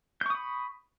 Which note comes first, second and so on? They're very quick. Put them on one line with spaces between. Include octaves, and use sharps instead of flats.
G6 C#6 D#6 B5